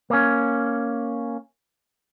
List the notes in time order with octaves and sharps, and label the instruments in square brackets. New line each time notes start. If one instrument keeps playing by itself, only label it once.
[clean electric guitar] A#3 C#4